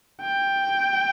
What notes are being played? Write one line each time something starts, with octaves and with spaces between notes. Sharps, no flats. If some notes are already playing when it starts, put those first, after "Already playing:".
G5